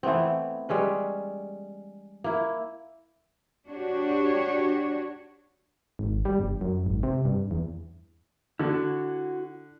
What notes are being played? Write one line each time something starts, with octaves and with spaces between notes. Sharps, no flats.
E3 A3 B3 C4
G3 G#3 C#4 B4
A#3 E4
D4 F#4 G4 C#5
G#1
G3
G1
F#2
G#1
C3
G2
E2
D3 E4 F#4